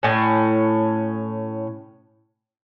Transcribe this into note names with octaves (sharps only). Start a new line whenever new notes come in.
A2 C#4